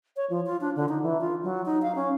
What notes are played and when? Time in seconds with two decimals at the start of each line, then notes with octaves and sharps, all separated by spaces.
0.16 C#5
0.30 F3
0.46 F4
0.61 D4
0.76 D3
0.89 D#4
1.03 E3
1.21 F4
1.43 F#3
1.66 D#4
1.82 F5
1.95 C#4